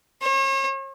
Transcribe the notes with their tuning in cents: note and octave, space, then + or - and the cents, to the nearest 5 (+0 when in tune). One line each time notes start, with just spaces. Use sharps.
C#5 -40